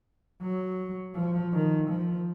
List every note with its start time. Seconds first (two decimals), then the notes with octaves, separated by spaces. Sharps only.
0.42 F#3
1.15 F3
1.53 D#3
1.90 F3